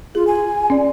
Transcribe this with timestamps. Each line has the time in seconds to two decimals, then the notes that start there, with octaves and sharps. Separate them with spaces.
0.15 F4 G#4
0.27 G#5
0.70 C#4 D5